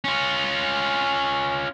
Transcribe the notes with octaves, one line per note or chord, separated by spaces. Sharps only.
C#4 F4